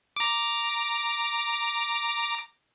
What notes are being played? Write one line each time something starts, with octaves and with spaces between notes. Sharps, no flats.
A#5 D6